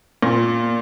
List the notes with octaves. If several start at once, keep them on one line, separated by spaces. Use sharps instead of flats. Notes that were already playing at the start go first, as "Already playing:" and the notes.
A#2